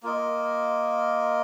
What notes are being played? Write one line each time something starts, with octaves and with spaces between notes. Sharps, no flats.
A#3 F4 A#4 D#5